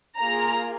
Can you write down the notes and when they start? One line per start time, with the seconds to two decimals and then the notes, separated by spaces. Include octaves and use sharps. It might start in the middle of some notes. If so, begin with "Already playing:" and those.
0.20 A#3 F4 G#4 A#5